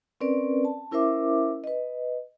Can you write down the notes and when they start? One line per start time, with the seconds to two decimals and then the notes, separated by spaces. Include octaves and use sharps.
0.21 C4 C#4 A#4 B4 D5
0.65 A5
0.91 C#4 E4 A#4 C5 E5 D6
1.64 B4 D#5